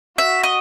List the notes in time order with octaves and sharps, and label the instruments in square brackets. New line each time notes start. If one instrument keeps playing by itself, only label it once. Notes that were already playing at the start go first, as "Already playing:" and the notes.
[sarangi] F#4 [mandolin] E5
[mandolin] D#5